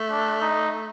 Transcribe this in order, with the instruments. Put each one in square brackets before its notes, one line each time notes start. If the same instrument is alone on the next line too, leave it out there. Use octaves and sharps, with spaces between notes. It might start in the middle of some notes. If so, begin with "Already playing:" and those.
Already playing: [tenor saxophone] A3
[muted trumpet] D4
D#4